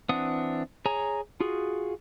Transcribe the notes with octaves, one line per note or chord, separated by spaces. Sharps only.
E3 C4 D4 F#5 D#6
G#4 C#5 G#5 A#5
F4 F#4 G#4